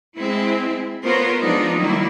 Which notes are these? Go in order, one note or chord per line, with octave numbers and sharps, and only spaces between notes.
G#3 C4 E4
B3 F4 A#4 C5 C#5
F3 G#3 B3 D4 D#4 F4
D#3 F#3 G3 A#3 E4